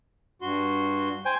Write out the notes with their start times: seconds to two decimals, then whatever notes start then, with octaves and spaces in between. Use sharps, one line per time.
0.42 G2 F#4 C6
1.25 C5 G5 G#5